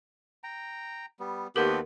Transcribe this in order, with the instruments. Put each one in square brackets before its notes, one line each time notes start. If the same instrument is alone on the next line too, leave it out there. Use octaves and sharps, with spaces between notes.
[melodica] G5 A#5
G3 B3
[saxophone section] D#2 B3 G4 [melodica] A3 C4 F#4 [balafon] A#4 F#5